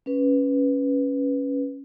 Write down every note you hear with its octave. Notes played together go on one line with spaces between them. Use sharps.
C#4 B4